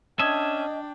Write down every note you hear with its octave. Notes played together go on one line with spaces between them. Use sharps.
C#4 D4 D#5 E5 G5 A5 D#6 G#6